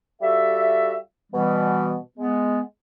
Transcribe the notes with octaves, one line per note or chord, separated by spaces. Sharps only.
G3 F4 F#4 A4 E5
B2 E3 G3 B3
G#3 B3